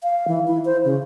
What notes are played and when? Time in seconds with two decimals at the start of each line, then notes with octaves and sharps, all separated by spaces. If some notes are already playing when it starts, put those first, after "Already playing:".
0.03 F5
0.28 E3
0.48 E4
0.65 C5
0.84 C#3